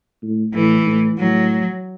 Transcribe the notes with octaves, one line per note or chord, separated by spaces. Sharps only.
A2
A2 E3
A2
A2 F#3